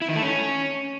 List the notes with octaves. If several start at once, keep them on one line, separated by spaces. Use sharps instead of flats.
E4
D#3
A3
C#4